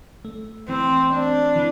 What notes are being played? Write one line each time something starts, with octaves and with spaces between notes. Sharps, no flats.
A3
E3 C4
C4 D4
E3